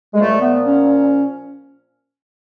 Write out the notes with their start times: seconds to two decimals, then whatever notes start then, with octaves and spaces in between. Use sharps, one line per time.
0.14 G#3
0.20 A#2 F3 A3
0.42 B3
0.63 C#4